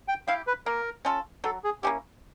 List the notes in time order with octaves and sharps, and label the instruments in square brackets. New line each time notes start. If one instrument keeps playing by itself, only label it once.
[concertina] G5
[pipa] E4 G4 [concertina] F5
[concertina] B4
[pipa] A#3 [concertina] A#4
[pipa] C#4 F4 A4
[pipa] F#3 [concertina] A4
[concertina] G#4
[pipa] A#3 C#4 E4 [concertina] G4